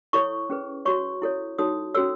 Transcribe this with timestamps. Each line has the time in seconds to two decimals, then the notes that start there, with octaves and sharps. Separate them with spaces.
0.13 E4 A4 C#5 C#6
0.50 C#4 G#4 B4
0.85 F#4 C#5 C#6
1.22 E4 A4 C#5
1.58 D#4 F#4 A4 C#5 D#6
1.94 C#4 F#4 A4 C#5 E6